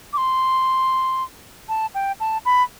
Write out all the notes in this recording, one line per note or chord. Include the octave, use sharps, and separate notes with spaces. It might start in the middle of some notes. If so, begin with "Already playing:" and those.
D6
C6
A5
G5
A5
B5